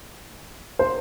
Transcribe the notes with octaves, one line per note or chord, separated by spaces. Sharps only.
C5